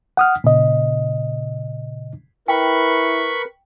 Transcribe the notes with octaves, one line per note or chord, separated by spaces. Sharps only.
F#5 D#6 F6
A#2 C#3 D#5
E4 A#4 B4 G5 B5 C#6